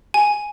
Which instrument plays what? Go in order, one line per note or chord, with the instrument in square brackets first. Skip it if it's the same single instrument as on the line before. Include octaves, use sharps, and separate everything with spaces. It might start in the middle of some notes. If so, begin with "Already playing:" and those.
[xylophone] G#5